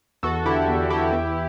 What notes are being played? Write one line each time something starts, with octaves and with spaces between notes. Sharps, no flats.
E2 F#4 A4
D3 E4 G4
E2
D3 E4 G4
E2